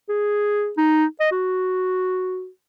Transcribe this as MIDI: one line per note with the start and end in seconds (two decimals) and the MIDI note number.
0.09 0.71 68
0.77 1.05 63
1.20 1.30 75
1.31 2.48 66